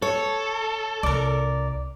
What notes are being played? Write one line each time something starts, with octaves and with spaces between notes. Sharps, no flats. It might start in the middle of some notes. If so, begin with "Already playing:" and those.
A4 C#5
C2 A#4 D5